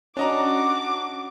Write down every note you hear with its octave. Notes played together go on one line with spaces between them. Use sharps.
C#4 D4 F#4 D#5 A#5 D6